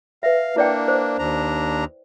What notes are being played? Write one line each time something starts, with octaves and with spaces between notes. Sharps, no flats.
B4 E5 F5
A#3 D4 E4 D5 G5
C5
D#2 D4 A#5